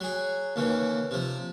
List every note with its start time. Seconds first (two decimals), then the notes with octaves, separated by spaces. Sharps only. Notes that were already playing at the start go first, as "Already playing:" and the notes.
0.01 F#3 G#4
0.56 D#2 C#3 E3
1.11 C3 F3